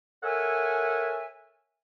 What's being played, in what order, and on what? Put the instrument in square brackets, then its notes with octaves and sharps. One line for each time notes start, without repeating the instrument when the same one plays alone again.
[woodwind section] A4 A#4 C#5 E5 F#5 G#5